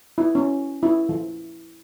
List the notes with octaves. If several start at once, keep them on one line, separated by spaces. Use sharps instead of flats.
E4
C#4
E4
F3